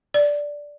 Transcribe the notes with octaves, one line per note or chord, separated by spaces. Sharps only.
D5